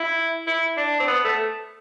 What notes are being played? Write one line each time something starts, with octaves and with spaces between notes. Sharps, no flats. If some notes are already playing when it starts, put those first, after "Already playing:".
Already playing: E4
E4
D4
C4
B3
A3